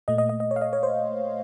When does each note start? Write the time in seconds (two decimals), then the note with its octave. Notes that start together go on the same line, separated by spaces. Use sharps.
0.08 A#2 A3 D#5
0.18 D#5
0.29 D#5
0.40 D#5
0.51 C#5
0.56 F5
0.61 D#5
0.73 C#5
0.83 C5